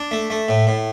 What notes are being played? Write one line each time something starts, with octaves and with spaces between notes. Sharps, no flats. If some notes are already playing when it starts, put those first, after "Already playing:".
Already playing: D4
A3
A3
A2
A2